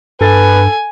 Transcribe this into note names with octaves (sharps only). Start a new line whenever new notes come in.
G2 A4 B4 G#5 A6